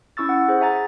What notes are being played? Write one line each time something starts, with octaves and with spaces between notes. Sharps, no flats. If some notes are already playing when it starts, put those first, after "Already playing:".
C#4 E4 C#6 E6 A6
F#5
G#4 C5
E5 G#5 A#5 A6